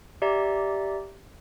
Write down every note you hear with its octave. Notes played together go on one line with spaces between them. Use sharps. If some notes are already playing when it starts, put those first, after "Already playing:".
G4 D5 E5 A#5